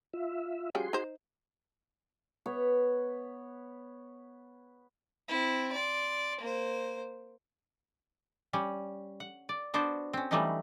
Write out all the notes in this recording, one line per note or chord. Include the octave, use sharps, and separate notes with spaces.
F4 E5
F3 G3 C#4 F#4 G#4 C6
D#4 C5
B3 C#5
C4 E4
D5 C6
A#3 C5
G3 C#4
F#5
D5
B3 D4 F#4 C5
C4 C#4
E3 F#3 G3 A3 C#4 D#4